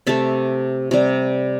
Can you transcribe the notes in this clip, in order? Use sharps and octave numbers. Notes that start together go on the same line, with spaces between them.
C3 A3 E5 A5
C3 G3